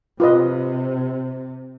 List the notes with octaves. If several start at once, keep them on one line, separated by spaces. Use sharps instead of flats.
C3 F4 B4 D#5